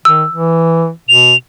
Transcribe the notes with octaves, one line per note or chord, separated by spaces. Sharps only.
D#3 E6
E3
B2 F7